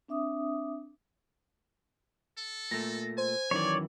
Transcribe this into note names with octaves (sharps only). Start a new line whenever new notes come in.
C4 D4 E5 D6 D#6
A4
A#2 A3 A#6
C5 G#5
F#2 D#3 E3 C#5 D5